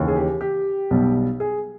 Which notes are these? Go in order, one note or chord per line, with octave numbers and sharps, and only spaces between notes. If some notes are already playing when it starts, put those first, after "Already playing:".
Already playing: D#2 C#3 E3
G#4
G4
G4
B1 B2 G3
G#4